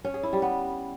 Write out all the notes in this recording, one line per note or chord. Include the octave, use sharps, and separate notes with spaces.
C#4
G#4
E4
G3
B3